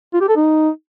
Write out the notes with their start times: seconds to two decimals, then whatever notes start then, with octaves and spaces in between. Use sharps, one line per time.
0.14 F4
0.21 G4
0.28 A4
0.36 D#4